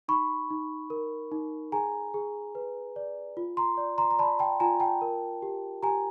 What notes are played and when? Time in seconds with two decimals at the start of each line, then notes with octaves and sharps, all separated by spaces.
0.08 D#4 B5 C#6
0.50 D#4
0.90 A#4
1.32 D#4
1.72 G#4 G#5 A#5
2.14 G#4
2.55 B4
2.96 D5
3.37 F4
3.57 A#5 C6
3.77 D5
3.98 A#5 C6
4.11 A#5
4.19 D5 A5 B5
4.39 G5 A5
4.60 F4 G#5 A#5
4.80 G5 A5
5.01 A#4
5.42 G4
5.83 G4 G#5 A#5